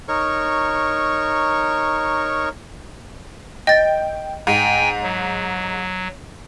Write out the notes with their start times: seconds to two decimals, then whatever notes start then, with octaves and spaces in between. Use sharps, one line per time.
0.08 D#4 A#4 C#5 C#6
3.67 D#5 G5 A6
4.47 G#2 G5 G#5
5.03 F#3